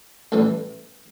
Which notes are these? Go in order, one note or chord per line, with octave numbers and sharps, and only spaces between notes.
A1 A2 E3 G3